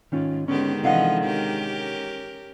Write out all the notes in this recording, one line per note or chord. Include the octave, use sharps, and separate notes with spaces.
G#2 D#3 C#4 F4
D3 D#3 G#3 B3 C#4 G4
C3 E3 F3 D4 A4 D#5 F5 F#5
C#4 G4 A#4